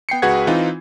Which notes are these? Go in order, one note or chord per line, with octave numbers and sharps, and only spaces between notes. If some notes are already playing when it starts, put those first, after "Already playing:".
B3 G5 C7 C#7
C#2 F#4 G#4 B4 F#5 G#6
E3 C4 D#4 F4